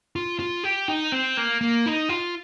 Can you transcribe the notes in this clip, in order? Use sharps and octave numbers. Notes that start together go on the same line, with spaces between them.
F4
F4
G4
D#4
C4
A#3
A#3
D#4
F4